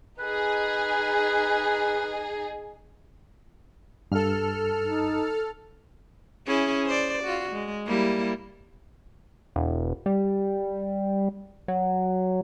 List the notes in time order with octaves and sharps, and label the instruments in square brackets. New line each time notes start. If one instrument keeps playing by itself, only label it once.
[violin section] D#4 G#4 [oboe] B4
[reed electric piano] G2 [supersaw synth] A4 F6
[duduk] D#4
[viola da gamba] C#4 E4 G#4
C5 D5
F4 F#4
G#3
G3 A#3 E4
[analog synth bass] E1
G3
F#3